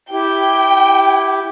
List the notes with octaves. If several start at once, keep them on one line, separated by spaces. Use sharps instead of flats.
E4 G4 G5